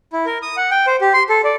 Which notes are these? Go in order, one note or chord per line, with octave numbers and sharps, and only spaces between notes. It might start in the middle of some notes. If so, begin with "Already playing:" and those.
E4
A#4
D#6
F#5
G5
C5
G4
C6
A4
D5